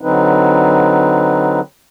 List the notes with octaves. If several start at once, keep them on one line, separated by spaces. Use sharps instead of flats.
D3 F#3 C4 D#4 B4